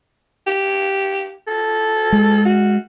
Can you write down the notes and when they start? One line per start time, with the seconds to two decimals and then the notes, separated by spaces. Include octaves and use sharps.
0.47 G4
1.47 A4
2.12 G#3
2.45 F#4